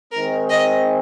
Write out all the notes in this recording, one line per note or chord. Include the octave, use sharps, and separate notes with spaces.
D#3 G#3 C4 A#4
D#5